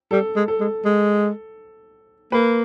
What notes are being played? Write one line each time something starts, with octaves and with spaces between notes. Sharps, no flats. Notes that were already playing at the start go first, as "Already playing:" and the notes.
G3 A4
G#3
A4
G#3
G#3
A#3 B4